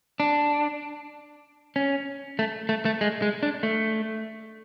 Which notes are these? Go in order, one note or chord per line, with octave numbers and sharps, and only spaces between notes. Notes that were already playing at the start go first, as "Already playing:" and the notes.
D4
C#4
A3
A3
A3
G#3
G#3
D4
A3